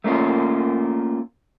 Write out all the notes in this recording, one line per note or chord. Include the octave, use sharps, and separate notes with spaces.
A3 A#3 C#4 F4